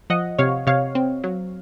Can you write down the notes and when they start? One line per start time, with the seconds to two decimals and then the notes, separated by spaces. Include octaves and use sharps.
0.10 F3 D#5 F#5
0.38 C3 C#5 F5
0.67 C3 C#5 F5
0.95 C4
1.24 F#3